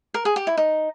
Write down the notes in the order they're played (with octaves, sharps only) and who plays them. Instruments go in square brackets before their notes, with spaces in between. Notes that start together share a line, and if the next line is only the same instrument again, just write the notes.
[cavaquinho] A#4
G#4
G4
E4
D#4